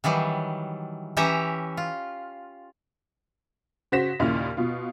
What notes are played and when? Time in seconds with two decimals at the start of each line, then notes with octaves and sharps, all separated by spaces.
0.04 D#3 E3 F#3 G3
1.17 E3 C#4 G4 E5 A#5
1.77 F4
3.92 C#3 F#4 C5 A#6 B6 E7
4.19 D#2 A#2 C#3 E4 F6
4.57 B2 F4